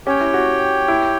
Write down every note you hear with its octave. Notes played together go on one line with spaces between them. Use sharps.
C#4 G4 C#5 G5
E4
F#4
E4